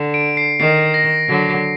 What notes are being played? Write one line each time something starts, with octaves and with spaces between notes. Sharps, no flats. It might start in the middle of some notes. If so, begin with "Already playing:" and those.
Already playing: D3
D7
C7
D#3 C7
A#6
D3 F#3